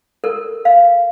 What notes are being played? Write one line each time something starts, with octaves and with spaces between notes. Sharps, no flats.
A4 A#4
F5